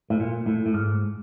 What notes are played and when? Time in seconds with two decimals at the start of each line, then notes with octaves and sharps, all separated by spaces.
0.10 A2
0.20 A#2
0.46 A2
0.66 A2
0.74 G#2